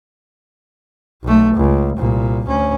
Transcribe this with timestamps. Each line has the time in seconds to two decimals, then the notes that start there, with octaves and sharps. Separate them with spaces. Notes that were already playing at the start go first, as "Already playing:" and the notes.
1.23 B1 A3
1.55 C#2
1.97 C2 A#2
2.46 D2 C#4